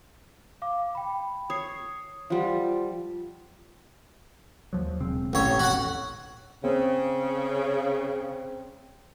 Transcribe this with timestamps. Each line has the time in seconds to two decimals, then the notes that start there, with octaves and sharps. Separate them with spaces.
0.62 F5 D6
0.95 G5 B5
1.50 C#5 D#6 C7
2.30 F3 G3 C5 F#5
4.73 D#2 F3 F#3
5.00 E1 C#3 C4
5.33 A1 C#5
5.59 F#4 F#5
6.64 C#3 C4